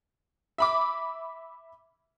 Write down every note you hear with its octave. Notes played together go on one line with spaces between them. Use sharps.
E5 B5 D6